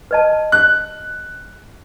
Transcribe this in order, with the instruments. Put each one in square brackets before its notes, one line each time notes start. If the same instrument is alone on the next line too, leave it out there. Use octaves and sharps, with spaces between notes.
[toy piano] B4 D#5 A5
[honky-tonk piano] F#6